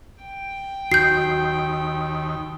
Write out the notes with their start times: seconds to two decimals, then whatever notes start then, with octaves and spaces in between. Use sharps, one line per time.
0.24 G5
0.92 D#2 F#4 G6 C7